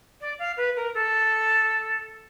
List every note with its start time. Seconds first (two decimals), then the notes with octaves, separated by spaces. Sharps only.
0.21 D5
0.39 F5
0.57 B4
0.76 A#4
0.94 A4